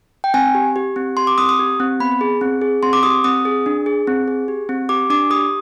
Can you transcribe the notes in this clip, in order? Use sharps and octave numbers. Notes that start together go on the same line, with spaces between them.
G5
C4 G#5
G4
G4
C4
G4 C6
D6
C4 D#6
D#6
G4
C4
B3 B5
G#4
C4
G#4
C4 C6
D6
G4 D#6
C4 D#6
G#4
D4
G#4
C4
G#4
G4
C4
G4 D6
D4 D6
G4 D#6